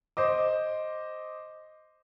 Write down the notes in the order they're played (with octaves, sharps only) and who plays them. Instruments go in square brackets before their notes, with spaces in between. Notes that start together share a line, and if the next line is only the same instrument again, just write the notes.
[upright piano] C5 D#5 D6